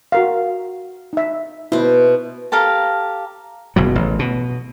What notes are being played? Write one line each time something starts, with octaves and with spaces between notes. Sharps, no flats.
F#4 A#4 F5
D#4 E5
B2 E4 C5
G4 A4 F5 A#5
F#1 B2 F#3
A1
B2